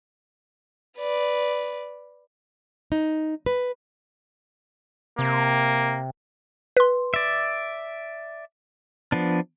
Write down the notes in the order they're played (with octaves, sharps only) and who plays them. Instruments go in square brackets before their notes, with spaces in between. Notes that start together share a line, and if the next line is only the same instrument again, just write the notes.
[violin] B4 D5
[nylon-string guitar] D#4
B4
[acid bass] C3 [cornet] A#3
[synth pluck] B4 C6
[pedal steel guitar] D5 E5
F3 B3 D4